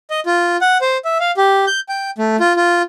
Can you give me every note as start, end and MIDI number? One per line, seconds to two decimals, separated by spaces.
0.10 0.20 75
0.26 0.57 65
0.61 0.78 78
0.81 0.98 72
1.05 1.18 76
1.20 1.31 77
1.37 1.65 67
1.67 1.80 91
1.89 2.10 79
2.18 2.36 57
2.40 2.53 65
2.56 2.82 65